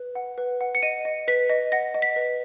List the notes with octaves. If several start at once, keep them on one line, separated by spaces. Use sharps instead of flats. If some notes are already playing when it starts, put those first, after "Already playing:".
Already playing: B4
F#5
B4
F#5
C#7
D#5 D#7
D#5
B4 B6
D#5
F#5 A#6
D#5
B6
B4